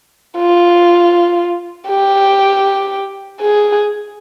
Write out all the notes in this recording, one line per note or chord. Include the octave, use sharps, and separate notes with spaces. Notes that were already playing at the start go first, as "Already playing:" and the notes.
F4
G4
G#4